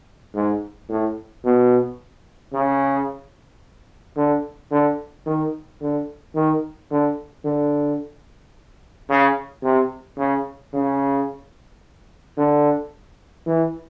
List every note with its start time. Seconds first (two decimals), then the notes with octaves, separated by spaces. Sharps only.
0.35 G#2
0.89 A2
1.44 B2
2.53 C#3
4.17 D3
4.71 D3
5.26 D#3
5.81 D3
6.35 D#3
6.91 D3
7.45 D3
9.09 C#3
9.63 C3
10.18 C#3
10.73 C#3
12.37 D3
13.47 E3